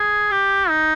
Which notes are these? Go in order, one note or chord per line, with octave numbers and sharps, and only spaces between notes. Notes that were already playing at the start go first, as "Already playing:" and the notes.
Already playing: G#4
G4
D#4